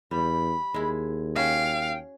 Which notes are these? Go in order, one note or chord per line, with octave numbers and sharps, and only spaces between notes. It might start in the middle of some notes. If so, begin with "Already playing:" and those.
E2 G3 B5
D#2 G#3 E4
C#4 F#4 F5 G5